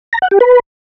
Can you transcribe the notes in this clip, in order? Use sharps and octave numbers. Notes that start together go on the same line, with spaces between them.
A#5
F#5
G4
B4